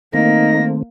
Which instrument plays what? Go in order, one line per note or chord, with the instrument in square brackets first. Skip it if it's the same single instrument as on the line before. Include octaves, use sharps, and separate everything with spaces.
[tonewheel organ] D#3 A3 C4 [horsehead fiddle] A#3 [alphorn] D#4 [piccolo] A#6